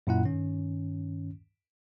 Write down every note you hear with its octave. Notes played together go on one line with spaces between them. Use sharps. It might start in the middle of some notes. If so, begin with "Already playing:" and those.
F#2 A#2 E4 F#5
G2 D#3 C#4